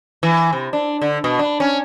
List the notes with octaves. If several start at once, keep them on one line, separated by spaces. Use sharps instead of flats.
E3
C3
D4
D3
B2
D4
C#4